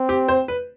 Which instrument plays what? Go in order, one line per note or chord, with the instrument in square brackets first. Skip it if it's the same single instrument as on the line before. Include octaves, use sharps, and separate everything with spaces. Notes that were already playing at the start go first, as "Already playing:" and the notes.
Already playing: [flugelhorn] C4
[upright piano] G4
C5
B4